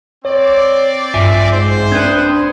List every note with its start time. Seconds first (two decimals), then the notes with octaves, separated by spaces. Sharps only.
0.25 C4 C#5 D5
1.14 A#1 G2 F4 E5 G#5 C7
1.52 G#2 C5
1.92 C4 D4 B4 D#6 G6 G#6